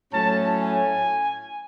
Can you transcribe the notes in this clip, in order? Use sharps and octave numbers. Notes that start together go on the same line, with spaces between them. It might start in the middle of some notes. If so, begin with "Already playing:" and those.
A2 F#3 A3 C#4 A5
G#5